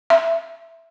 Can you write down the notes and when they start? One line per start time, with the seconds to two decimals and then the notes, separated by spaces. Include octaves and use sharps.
0.10 E5